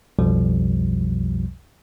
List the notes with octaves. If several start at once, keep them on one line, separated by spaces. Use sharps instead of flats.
B1 F2 B2 F3 G3